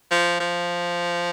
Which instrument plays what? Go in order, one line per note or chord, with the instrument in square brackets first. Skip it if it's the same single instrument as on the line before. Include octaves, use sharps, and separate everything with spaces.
[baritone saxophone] F3
F3